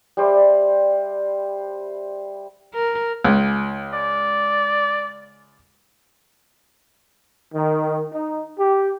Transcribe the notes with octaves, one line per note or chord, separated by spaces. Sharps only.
G3 C5 D5 E5
A#4
C#2
D5
D#3
D#4
G4